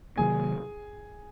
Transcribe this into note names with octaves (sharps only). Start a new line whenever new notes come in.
C3 D#3 F#3 A#3 G#4 G#5